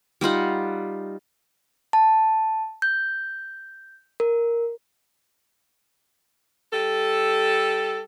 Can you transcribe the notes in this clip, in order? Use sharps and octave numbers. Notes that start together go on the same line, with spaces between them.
G3 D#4 F4 F#5
A5
G6
A#4
G3 A4